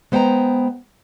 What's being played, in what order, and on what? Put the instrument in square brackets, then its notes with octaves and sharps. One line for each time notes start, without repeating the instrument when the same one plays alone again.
[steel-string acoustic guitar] G#3 B3 C5 F#5 G5 A#5